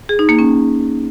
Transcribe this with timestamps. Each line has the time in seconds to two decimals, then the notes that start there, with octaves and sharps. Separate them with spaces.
0.09 G#4
0.19 D#4
0.29 A#3
0.39 C#4